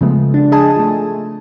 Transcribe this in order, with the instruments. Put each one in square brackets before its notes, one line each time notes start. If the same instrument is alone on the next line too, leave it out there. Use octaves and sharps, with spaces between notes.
[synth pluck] C#3 F3 G#3 A3 B3
D4
G#4 D#5 G#5 A5
F3 A3